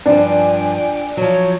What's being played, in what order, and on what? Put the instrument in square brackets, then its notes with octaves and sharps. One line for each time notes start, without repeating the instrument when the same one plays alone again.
[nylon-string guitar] G2 F3 [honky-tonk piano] D4 [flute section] G5 G#5
[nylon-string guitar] F3 F#3 [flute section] C#5